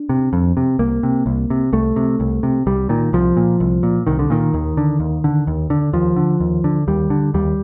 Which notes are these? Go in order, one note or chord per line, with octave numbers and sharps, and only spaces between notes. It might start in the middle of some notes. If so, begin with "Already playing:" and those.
Already playing: D4
C3
F2
C3
C2 A#3
C3
C2
C3
C2 A3
C3
C2
C3
C2 G3
A#2 D#3
C2 F3
A#2
C2
A#2
C2 D#3
D3
A#2 D#3
D#2
D3
D#2
D3
D#2
D3
D#2 F3
D3
D#2
D3
D#2 G3
D3
D#2 G3